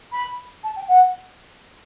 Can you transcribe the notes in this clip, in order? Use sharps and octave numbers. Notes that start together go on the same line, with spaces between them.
B5
A5
G5
F#5